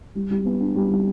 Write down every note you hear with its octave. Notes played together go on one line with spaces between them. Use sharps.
G3
G3
B3
D4
G3
G3